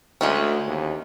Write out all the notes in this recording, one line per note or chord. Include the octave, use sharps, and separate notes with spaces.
D2 G#3 A3 C#4
D#2